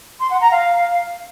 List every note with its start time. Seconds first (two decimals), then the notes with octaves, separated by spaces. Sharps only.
0.20 C6
0.31 F#5
0.41 A#5
0.51 F5